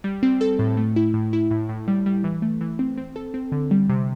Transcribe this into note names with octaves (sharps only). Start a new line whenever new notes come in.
G3
C4
A4
A2
A3
E4
A2
E4
A2
A2
G3
G3
E3
A3
E3
C4
C4
A4
C4
D3
G3
C3